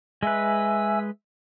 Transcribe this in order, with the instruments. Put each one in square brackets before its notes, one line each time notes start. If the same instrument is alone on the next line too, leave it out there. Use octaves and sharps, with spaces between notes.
[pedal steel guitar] G#3 B4 [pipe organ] E5 G#5 E6